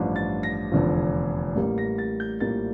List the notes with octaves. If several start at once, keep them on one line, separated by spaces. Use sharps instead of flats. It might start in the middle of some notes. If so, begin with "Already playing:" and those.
Already playing: A1 G2 F3
A6
A#6
F1 E2 D3 F3
A1 A2 G3 A#3
A#6
A6
G6
A#1 A2 G3 A#3 A6